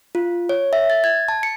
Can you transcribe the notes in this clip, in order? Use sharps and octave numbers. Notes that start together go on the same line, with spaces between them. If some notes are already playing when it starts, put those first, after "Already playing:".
F4
C#5
E5
A6
G#6
A5
C#7